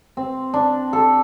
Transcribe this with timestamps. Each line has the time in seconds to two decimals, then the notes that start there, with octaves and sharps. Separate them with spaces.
0.17 C4
0.54 D4
0.93 A4